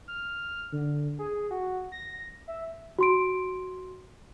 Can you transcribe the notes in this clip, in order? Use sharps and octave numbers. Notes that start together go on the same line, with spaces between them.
F6
D3
G#4
F#4
A#6
E5
F#4 C6 D7